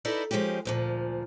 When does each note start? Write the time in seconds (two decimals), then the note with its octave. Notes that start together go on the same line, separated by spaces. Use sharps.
0.05 D#4 E4 A4 B4 D5 D#5
0.31 F3 G#3 C#4 D#4 G4
0.65 D2 A#2 F3